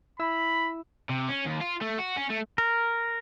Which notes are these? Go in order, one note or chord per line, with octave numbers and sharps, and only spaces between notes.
E4 B5 E6
C3
C#4
D#2
F4
A3
F#4
C#4
A3
A#4